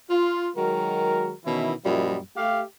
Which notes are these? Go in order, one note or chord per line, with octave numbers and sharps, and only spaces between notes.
F4
D#3 F#3 G#3 F#4 A#4
B2 D#3 E3 C#4 E4
F#2 A#2 F3 G3 E4 D#5
A3 G4 F5